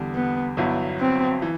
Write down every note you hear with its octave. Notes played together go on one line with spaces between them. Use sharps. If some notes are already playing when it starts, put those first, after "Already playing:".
Already playing: E2 D3 G3
B3
G1 G2 F#3 B3 E4
C4
E3